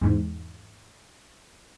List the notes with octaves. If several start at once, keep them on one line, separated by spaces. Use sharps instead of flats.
E2 G#2